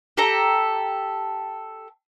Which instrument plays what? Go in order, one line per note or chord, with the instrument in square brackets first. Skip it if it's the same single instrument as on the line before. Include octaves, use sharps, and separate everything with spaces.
[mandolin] G4 A4 A#5